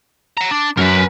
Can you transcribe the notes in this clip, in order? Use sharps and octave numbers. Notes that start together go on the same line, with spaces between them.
F#5 A#5
D4
F#2 A#4 B4